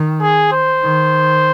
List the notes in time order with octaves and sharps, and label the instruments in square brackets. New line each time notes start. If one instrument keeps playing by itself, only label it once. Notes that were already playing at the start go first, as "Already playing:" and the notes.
Already playing: [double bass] D#3
[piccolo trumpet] G#4
C5
[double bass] D#3